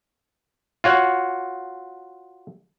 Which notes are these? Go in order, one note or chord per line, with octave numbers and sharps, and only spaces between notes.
F4 F#4 C#5